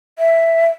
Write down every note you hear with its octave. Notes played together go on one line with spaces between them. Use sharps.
E5